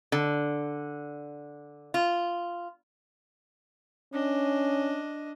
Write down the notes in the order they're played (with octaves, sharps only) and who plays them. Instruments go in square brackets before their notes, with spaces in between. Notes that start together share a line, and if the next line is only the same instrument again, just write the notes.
[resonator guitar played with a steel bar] D3
F4
[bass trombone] C#4 [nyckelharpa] D4 D#5